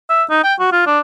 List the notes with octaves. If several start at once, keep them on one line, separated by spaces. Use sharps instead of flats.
E5
D#4
G5
F#4
F4
D4